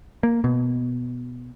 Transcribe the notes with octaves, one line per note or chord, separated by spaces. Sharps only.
A#3
B2